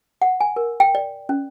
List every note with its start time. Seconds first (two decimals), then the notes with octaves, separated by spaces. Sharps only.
0.22 F#5
0.41 G#5
0.56 A#4
0.80 G5
0.95 D5
1.29 C#4